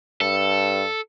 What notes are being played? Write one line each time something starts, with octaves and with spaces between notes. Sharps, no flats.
G2 A4